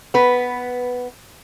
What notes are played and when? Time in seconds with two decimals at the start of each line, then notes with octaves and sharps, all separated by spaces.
0.14 B3 B4